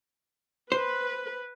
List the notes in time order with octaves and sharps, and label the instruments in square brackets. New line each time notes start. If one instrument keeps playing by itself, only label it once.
[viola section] B4 [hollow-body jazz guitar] C5